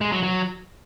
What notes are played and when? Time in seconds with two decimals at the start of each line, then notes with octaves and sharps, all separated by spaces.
0.01 G#3
0.12 F#3
0.23 F#3